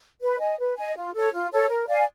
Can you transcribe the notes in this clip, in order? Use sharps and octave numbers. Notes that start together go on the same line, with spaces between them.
B4
D#5 G#5
B4
D#5 G#5
F4
A4 C#5
F4
A4 C#5
A#4
D5 F5 G#5